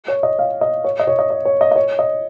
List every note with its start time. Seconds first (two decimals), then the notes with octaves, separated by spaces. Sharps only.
0.08 C#5
0.23 D#5
0.39 F5
0.61 D#5
0.84 C#5
1.00 D#5
1.07 C#5
1.19 D#5
1.30 D#5
1.45 C#5
1.61 D#5
1.71 D#5
1.76 C#5
1.99 D#5